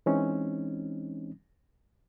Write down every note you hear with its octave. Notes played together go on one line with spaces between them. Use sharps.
E3 G#3 C4 C#4 D#4